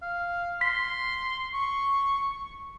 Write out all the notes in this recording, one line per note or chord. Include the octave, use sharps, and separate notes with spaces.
F5
C6 B6
C#6